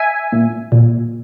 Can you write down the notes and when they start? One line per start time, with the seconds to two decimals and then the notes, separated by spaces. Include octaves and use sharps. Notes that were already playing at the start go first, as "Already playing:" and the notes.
Already playing: E5 G#5
0.32 A#2
0.72 A#2